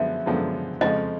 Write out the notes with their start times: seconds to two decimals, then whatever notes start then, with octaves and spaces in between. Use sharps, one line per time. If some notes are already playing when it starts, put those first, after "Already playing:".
Already playing: F#2 D3 F3 G#3 B3 E5
0.26 F#2 D3 F3 G#3 B3
0.81 F2 C#3 F3 G#3 D#5